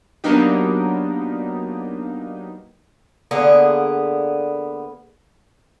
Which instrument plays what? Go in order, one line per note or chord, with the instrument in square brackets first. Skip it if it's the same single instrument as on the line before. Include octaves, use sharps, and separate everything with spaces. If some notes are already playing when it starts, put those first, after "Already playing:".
[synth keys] F#3 A#3 B3 D4 D#4 G4
[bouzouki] D3 A#3 B3 G#4